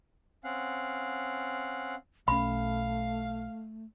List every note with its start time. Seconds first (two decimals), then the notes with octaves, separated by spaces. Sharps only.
0.44 C4 C#4 F5 F#5
2.28 B1 A3 C#4 F5 B5